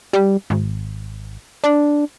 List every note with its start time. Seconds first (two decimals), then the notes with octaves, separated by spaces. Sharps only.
0.13 G3
0.50 G#1
1.64 D4